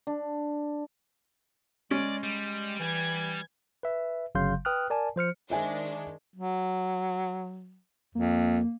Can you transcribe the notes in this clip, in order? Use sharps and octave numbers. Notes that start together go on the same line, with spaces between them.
D4
G#3 C#4 D5
G3 G#3
E3 G#6
B4 E5
G1 C#3 F#3 F5 C6 G6
B4 G5 D#6 F6 F#6
A#4 D5 G#5 A5
F3 C5 F6 C#7
D#3 G#3 D4 C5 E5 G#5
F#3
F2 A#3